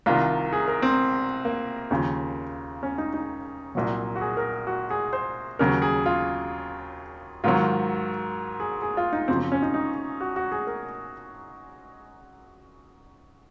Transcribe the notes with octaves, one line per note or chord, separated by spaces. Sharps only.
C2 C3 D#3 F4
G#4
A#4
C4
A#3
D#2 C#3 F3
C#4
D#4
D#4
C2 A#2 F#3
F#4
G#4
A#4
F#4
G#4
C5
D#2 C#3 F#3 A#4
G#4
F4
G#2 D#3 F#3 F4
G#4
G#4
F4
D#4
F#2 C#3 F3 C4
C4
C#4
D#4
D#4
F#4
F#4
G#4
A#4